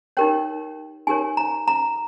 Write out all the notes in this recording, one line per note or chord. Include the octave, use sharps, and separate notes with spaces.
D#4 G4 A#4 C#5 G5
D#4 G4 A#4 C#5 G#5
A#5
A#5